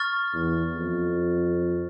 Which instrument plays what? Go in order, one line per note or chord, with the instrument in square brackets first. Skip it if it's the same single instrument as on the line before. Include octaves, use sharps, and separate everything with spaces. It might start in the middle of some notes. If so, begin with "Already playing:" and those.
Already playing: [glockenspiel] C#6 F6 A6
[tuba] E2
F2